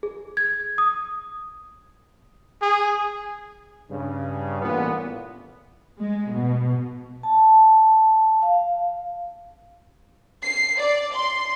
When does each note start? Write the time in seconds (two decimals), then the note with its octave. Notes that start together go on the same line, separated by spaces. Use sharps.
0.03 G#4
0.37 G#6
0.78 D#6
2.62 G#4
3.90 G2 C#3
4.62 A1 A#2 B3
5.99 G#3
6.33 B2
7.23 A5
8.43 F5
10.43 C7
10.79 D5
11.14 C6